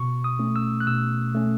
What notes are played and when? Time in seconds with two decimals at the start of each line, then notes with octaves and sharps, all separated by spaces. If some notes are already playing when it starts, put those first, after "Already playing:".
Already playing: B2 C#6
0.24 D#6
0.39 A3 C#4
0.56 E6
0.80 F#6
0.87 B2 E6
1.35 A3 C#4